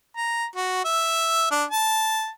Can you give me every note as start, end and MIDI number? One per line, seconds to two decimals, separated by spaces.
0.17 0.45 82
0.55 0.80 66
0.85 1.48 76
1.51 1.65 62
1.71 2.29 81